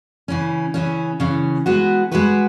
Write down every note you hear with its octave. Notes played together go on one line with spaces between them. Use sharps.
C#3 E3 C#4
C#3 E3 C#4
C#3 E3 C#4
G#3 B3 F#4 B4
G#3 B3 F#4 B4